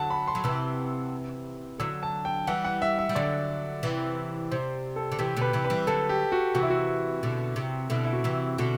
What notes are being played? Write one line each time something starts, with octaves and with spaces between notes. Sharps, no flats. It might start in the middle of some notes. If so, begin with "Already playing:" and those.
Already playing: D3 F#3 F#5 A5
B5
C6
F#3
C3 E3 E6
D3 F#3 E6
A5
G5
E3 G3 F#5
F#5
E5
E5
G3
D3 F#3 D5
C3 E3
C3 C5
A4
D3
C3 E3 G4
B2 D3 B4
C3 E3
B4
E3 G3
D3 F#3 A4
G4
F#4
C3 E3 F#4
E4
F#4
B2 D3
C3
B2 D3 E4
E4
F#4
C3 E3
B2 D3 F#4